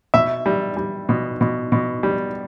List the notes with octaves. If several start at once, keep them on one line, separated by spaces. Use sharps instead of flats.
B2 E5
G3
G3
B2
B2
B2
G3